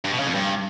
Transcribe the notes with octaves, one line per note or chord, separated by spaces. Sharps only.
G2
B2
C#3
F2
G2